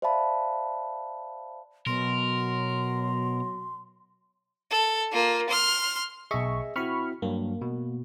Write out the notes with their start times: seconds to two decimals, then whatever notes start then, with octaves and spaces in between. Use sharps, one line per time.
0.02 C5 D5 E5 F5 A5 B5
1.87 B2 F#3 A#4 C6
4.71 A4
5.12 A#3 F4
5.49 C6 F6
6.31 B1 G#4 D#5 E5 C#6
6.76 C4 E4 F#4 B5 C#6 F6
7.22 G2 F#3 A#3
7.61 B2